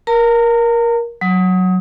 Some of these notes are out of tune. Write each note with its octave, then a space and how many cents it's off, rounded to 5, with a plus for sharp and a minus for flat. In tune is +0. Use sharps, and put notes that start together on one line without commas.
A#4 +15 A#5 -35
F#3 +0 D#6 +25